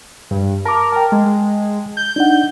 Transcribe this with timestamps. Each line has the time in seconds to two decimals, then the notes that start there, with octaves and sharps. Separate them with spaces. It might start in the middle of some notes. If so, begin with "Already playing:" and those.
0.31 G2
0.65 A#4 A5 D6
0.92 G5 A5
1.12 G#3
1.97 G6
2.16 D4 D#4 F#5